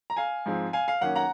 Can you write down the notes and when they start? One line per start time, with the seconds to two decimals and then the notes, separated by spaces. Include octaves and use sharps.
0.10 A#5
0.16 F5 G#5
0.46 G#2 F3 G#3 C4
0.73 F5 G#5
0.88 F5
1.01 F#2 D#3 A#3 C#4 F#5
1.15 F#5 A#5